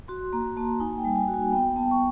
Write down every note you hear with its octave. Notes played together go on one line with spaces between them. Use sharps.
F#4 C6
A#3 A#5
A#3 A5
D#4 G#5
G5
G3
G#5
F#4
G#5
B3 G5
B3 A5
C#6